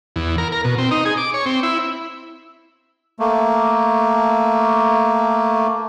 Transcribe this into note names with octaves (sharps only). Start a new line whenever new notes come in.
E2
A#4
A#4
B2
C4
D#4
G#4
D6
C#5
C4
E4
A3 A#3